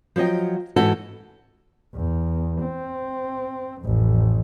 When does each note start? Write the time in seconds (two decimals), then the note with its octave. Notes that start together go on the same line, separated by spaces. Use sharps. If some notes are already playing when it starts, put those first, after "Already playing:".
0.16 F3 F#3 C#5 D#5 G5
0.76 G#2 E3 F#4 A4
1.95 E2
2.63 C4
3.82 A1 F2